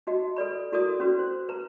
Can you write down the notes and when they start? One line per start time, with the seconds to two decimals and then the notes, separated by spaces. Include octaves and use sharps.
0.07 D#4 F#4 D#5
0.36 A4 B4 D5 B5
0.72 E4 F#4 A4 A#4 D5 D#6
1.00 C#4 F#4 B4
1.19 C5
1.49 B4 A#5